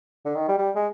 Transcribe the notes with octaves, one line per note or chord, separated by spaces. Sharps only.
D3
D#3
G3
G3
G#3